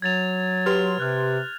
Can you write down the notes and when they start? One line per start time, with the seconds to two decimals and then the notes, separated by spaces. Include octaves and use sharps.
0.02 F#3 G#6 A6 F7
0.66 G4 B4 C6 F6 F7
1.00 C3 F6 F#6